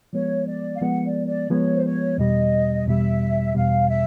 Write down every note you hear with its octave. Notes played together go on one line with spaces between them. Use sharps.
F3 G#3 B3 C#5
D5
F5
F3 G#3 B3 F#5
D5
D5
F3 G#3 B3 C#5
C5
C#5
E2 B2 G3 D#5
E2 B2 G3 E5
E2 B2 G3 F5
E5